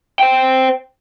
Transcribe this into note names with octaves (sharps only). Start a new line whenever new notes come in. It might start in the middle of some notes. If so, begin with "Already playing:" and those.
C5 G5